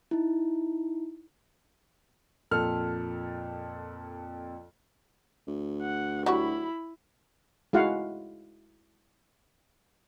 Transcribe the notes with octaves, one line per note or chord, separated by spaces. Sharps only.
D#4 E4
F2 A#2 A4 A5 F6
D2
F#5
F#3 G3 E4 F#4 B5
G#3 E4 F#4 F5 F#5